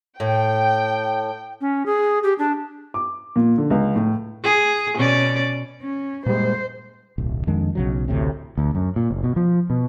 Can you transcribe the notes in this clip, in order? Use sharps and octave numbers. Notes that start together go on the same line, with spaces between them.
A2 G5
C#4
G#4
G4
D4
D6
A#2
D3
C#2
A2
G#4
B2 C#4 D5
C#4
A#2 G3 G#3 C5
D1 B1
F2 D#3 G#3 D4
B1 C#3 F#3
A1 D2 A2 C3
D2
F#2
A#2
F#1
B2
F3
B2